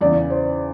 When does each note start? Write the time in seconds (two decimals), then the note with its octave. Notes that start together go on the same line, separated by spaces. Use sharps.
0.01 E2 C#3 E3 D5
0.30 C5